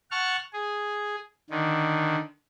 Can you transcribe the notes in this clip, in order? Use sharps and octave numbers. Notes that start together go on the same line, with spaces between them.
F#5 A5 C#6 F6
G#4
D3 D#3